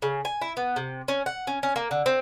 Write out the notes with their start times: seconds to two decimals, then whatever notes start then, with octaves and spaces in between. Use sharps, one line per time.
0.02 C#3
0.25 G#5
0.41 E4
0.57 B3
0.76 C3
1.08 C#4
1.26 F#5
1.47 C#4
1.63 C#4
1.76 A#3
1.91 D3
2.06 C4